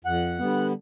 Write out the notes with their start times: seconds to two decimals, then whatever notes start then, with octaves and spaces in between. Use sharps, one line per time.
0.05 F2 F#5
0.39 D3 G3 B3